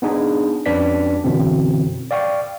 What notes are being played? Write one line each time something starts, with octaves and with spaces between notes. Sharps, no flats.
B3 D4 D#4 G#4
F2 C#4 D4 B4 D5 B6
F#2 B2 D3 E3 C4
D5 F5 G5 C#6